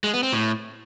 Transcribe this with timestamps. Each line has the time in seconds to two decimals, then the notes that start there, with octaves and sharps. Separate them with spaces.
0.04 G#3
0.13 B3
0.23 C4
0.33 A2